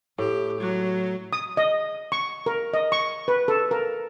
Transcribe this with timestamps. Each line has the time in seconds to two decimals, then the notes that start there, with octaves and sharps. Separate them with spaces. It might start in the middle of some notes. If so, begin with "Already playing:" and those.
0.18 A2 G4
0.60 F#3
1.33 D#6
1.57 D#5
2.12 C#6
2.46 A#4
2.74 D#5
2.92 C#6
3.28 B4
3.48 A4
3.71 A#4